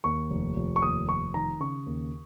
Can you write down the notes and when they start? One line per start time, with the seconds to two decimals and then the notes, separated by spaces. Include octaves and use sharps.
0.04 D#2 C#6
0.30 F1
0.56 F1
0.76 C#6
0.82 D#2 D#6
1.09 F1 C#6
1.34 D#3 A#5
1.60 C#3 C#6
1.86 D#2